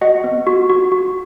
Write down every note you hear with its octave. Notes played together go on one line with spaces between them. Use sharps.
F#4 D#5 F#5
B3
F#4
F#4
F#4